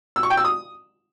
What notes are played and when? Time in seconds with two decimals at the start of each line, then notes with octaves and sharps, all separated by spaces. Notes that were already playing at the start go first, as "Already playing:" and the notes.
0.16 E6
0.23 C#6
0.30 G5
0.37 E6
0.45 D#6